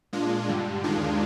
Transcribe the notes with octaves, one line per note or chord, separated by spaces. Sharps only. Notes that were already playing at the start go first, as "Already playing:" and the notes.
A#2 G#3 D4 F4
G2 D3 G3
D#2 D#3 G#3 D4 F4